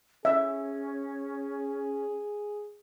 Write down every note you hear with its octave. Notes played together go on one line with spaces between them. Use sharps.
C#4 G#4 E5